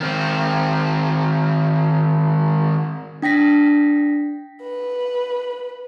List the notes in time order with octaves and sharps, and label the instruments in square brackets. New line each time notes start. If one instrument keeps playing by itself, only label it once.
[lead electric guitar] D#3 C4
[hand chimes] D4 G5 A#6 B6
[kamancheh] B4